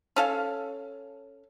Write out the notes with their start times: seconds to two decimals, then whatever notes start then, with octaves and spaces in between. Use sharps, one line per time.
0.16 C#4 A4 F5